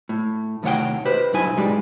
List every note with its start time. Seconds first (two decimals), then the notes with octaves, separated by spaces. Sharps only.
0.09 A2
0.63 D#2 A2 C3 C#5 F#5 G5
1.05 G4 B4 C5
1.33 B1 G2 E4 G#5
1.57 G#2 G3 G#3 G4